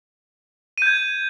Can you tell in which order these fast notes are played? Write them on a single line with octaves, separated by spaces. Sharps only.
D#7 G6 G#6